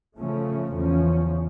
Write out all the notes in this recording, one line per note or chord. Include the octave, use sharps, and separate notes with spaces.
C#3 F3 A3 C#4
E2 C#3 F3 C#4